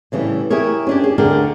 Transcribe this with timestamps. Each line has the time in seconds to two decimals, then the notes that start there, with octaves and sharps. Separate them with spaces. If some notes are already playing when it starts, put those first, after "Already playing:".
0.12 A2 C#3 E3 G3
0.51 E4 G4 G#4 A#4 C#5
0.87 C#4 D4 G4
1.04 G#4
1.18 D2 D3 G#4 A#4 D5 G5